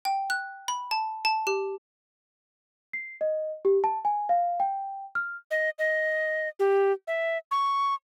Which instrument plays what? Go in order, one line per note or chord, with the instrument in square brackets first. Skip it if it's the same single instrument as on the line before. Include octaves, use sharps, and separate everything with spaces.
[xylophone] G5
F#6
B5
A5
A5
G4
[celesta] C7
D#5
G4
A5
G#5
F5
G5
F6
[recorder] D#5
D#5
G4
E5
C#6